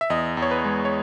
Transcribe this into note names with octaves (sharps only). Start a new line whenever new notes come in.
E5
E2 D#5
E2
C#5
B4
G#3
C#5